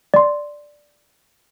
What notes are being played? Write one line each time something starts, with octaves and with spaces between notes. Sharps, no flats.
D5 C6